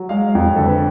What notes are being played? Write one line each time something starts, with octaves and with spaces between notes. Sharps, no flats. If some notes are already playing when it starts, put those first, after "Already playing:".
Already playing: F#3
G#3 F5
F5
F2
D3 A4
B4